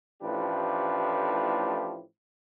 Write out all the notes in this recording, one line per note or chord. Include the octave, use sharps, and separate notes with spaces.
A1 A2 F3 D4 G4 B4